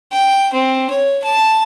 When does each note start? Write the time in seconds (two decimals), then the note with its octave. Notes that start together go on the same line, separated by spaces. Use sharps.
0.12 G5
0.53 C4
0.90 C#5
1.24 A5